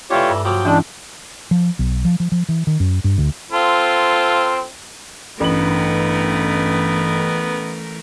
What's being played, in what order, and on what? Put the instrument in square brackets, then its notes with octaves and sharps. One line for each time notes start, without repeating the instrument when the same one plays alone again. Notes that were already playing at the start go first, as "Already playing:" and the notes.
[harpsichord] E3 A3 D4 [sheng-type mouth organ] F4 G4 C#5
[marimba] G2
[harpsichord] F3 F#3 A#3 [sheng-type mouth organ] G5
[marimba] E3 C#4 E4 [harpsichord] G#3 [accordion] D4
[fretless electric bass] F3
B1
F3
F3
F3
E3
D#3
F#2
G2
D2
[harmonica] C4 F4 A4
[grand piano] A1 F#7 [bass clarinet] G2 [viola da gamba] E3 A3 A#4 [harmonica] B3